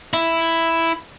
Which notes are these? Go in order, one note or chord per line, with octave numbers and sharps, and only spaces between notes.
E4